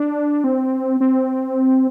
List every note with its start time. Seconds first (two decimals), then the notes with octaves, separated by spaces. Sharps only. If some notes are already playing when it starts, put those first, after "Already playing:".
Already playing: D4
0.44 C4
1.01 C4